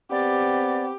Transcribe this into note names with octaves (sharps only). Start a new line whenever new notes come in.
B3 C4 G4 D5